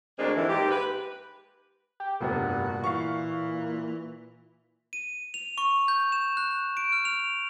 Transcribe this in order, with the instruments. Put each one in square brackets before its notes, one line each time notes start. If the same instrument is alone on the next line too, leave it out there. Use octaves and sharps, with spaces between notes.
[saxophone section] D2 G#3 A#3 C4 D4
F2 G#2 D#3 E3
G#2 A#3 G4
B4
[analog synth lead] G4
[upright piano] F1 G2 B3 [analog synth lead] A#2 [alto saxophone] F#4
[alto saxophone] E3 [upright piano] F5 C#6
[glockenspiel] D#7
F7
C#6
G6
E7
F#6
D7
F6
F7